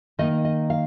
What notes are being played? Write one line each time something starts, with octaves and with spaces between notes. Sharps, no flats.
D#3 A#3 D#4 D#5
D#5
F5